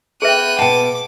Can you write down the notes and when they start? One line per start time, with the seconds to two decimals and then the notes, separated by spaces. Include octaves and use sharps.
0.22 B3 G#4 B4 E5 G5 F#6 D#7
0.59 B2 F#5 G5 A5 D6